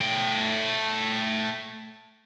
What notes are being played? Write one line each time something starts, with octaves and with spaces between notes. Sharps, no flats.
A3 G5